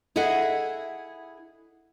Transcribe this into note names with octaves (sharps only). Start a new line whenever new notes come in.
E4 G#4 A4 D#5 E5 F#5